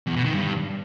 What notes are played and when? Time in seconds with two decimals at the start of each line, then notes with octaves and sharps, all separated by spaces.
0.07 E2
0.15 B2
0.24 D#3
0.33 G2